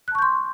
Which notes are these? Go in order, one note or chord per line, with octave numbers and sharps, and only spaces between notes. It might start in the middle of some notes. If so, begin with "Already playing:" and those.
A5 C6 C#6 F#6 G6